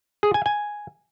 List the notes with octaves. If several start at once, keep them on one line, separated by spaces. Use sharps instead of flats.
G#4
G#5
G#5